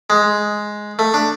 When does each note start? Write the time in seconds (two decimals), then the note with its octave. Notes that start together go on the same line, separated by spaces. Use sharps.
0.10 G#3
0.99 A3
1.14 D4